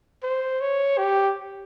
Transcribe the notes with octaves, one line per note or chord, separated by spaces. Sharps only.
C5
C#5
G4